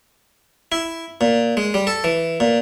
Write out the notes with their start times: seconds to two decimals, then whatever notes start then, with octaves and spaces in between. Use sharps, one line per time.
0.72 E4
1.21 A#2
1.57 G#3
1.74 G3
1.87 A4
2.04 E3
2.40 A#2